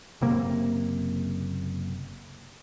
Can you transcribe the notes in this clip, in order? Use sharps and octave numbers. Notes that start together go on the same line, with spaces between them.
F#1 C3 A#3